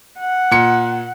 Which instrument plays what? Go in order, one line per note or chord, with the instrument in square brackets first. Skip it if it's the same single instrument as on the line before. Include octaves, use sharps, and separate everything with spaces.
[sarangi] F#5
[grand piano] A#2 C#7